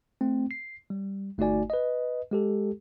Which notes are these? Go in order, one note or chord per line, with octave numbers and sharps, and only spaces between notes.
A3 C4
C7
G3
G1 A3 D#4 F#4 D5 G#5
B4 D#5
G#3 G4 A4